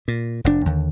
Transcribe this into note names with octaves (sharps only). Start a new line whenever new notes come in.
A#2
F1 G#2 D4
D#2 D3